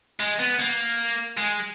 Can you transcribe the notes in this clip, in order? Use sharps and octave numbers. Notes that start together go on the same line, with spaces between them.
G#3
B3
A#3
G#3